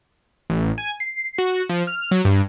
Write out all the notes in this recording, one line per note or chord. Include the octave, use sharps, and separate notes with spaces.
A1
G#5
C7
F#4
F3
F6
F#3
G2